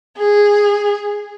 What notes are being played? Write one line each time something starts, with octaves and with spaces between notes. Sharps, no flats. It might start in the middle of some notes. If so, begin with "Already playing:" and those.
G#4